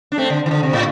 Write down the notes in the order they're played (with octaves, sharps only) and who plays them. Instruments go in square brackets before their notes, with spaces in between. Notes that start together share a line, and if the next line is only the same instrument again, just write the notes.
[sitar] D4
A3 C4
D3
E3
D3
C3
A2